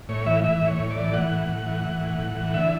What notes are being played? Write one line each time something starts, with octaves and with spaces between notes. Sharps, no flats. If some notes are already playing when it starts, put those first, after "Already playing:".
A2 C#5
E3 E5
E3 E5
A2
C#5
A2
D5
E3
E3 F#5
A2
A2
E3
E3
A2
A2
E3
D3 E5